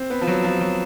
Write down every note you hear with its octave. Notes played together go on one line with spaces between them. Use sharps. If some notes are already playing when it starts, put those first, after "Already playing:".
Already playing: C4
B3
F3
F#3
F3
F#3